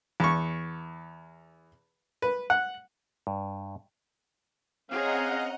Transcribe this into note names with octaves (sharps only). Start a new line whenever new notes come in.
E2 C#6
B4
F#5
G2
C4 C#4 G#4 C#5 D#5 F5 F#5 A#5